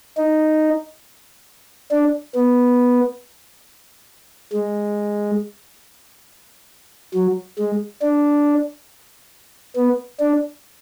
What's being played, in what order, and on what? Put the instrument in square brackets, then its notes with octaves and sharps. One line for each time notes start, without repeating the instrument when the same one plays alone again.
[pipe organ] D#4
D4
B3
G#3
F#3
G#3
D4
B3
D4